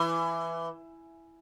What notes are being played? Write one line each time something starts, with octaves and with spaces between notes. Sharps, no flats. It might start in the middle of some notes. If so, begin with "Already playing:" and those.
Already playing: E3